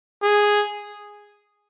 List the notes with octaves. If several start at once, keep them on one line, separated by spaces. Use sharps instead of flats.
G#4